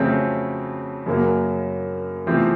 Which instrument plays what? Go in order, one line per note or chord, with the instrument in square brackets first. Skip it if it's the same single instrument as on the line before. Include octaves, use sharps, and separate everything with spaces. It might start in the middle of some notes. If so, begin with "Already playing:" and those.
Already playing: [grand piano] F2 C#3 F#3 A3 C4
F#2 C#3 F#3 A#3
E2 C3 F3 A3 C4